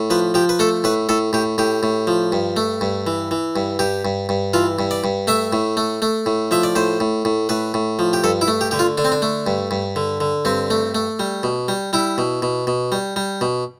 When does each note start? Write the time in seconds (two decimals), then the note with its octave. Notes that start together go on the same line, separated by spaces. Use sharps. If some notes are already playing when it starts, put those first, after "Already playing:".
Already playing: A2
0.10 F3 B4
0.34 F3 G4
0.49 B4
0.59 A3 A4
0.84 A2 B4
1.09 A2 A4
1.33 A2 G4
1.58 A2 G4
1.83 A2
2.07 F3
2.32 G2
2.56 A3
2.81 G2
3.07 E3
3.31 E3
3.56 G2
3.79 G2 G4
4.05 G2
4.29 G2
4.54 E3 F4
4.79 G2
4.91 D5
5.04 G2
5.27 A3 E5
5.53 A2
5.77 A3
6.02 A3
6.26 A2
6.51 F3 E5
6.63 D5
6.75 A2 C5
7.00 A2
7.25 A2
7.49 A2 B4
7.74 A2
7.99 F3
8.13 G4
8.24 G2 A4
8.41 E4
8.48 A3
8.61 G4
8.71 D3 G4
8.79 F4
8.98 D3 D4
9.05 C4
9.12 D4
9.22 A3
9.47 G2
9.71 G2
9.96 D3
10.21 D3
10.45 G2 C4
10.70 A3
10.95 A3
11.19 G3
11.43 B2
11.68 G3
11.93 G3 E4
12.18 B2
12.42 B2
12.67 B2
12.92 G3
13.16 G3
13.41 B2